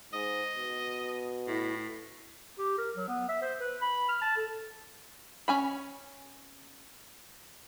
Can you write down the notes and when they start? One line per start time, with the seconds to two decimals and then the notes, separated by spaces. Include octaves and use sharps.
0.13 G#2 D#5
0.57 B2
1.47 A2 E4
2.58 G4
2.78 A#4
2.96 F#3
3.08 B3
3.28 E5
3.42 C5
3.60 B4
3.81 B5
4.08 F6
4.22 A5
4.36 A4
5.48 C#4 G#5 B5